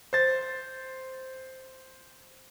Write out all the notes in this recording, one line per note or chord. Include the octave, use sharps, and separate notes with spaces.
C5 A6